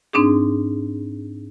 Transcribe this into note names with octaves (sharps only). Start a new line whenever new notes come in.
G#2 C4 D4 D#4 G#4